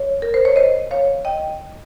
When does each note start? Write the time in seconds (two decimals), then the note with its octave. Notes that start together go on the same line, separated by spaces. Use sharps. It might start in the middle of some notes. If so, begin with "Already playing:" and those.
Already playing: C#5
0.22 A#4
0.34 C5
0.45 C#5
0.56 C5 D#5
0.91 C#5 F5
1.25 D#5 G5